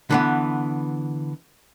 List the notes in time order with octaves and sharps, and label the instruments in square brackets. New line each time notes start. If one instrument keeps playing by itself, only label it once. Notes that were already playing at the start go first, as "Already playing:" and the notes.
[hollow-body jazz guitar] D3 E3 B3